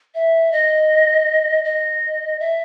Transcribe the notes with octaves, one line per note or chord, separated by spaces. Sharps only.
E5
D#5
D#5
E5